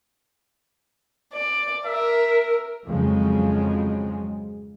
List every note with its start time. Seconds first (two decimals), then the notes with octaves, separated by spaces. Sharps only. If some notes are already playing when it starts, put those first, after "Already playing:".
1.33 D5
1.86 A#4 E5
2.87 F2 G#2 C#3 F3 F#3 G#3